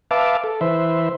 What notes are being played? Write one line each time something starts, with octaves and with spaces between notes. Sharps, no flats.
B4 E5 F5 A5 D6
A4
E3 B4 C5 E5